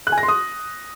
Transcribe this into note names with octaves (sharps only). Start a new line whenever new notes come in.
F#6
G#5
A#6
C6
D#6